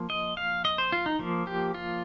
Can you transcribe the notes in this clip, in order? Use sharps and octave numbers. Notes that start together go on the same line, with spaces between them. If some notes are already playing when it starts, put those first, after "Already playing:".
Already playing: F3 A#3
D#5
F5
D#5
C5
F4
D#4
F3 A#3
G4
F4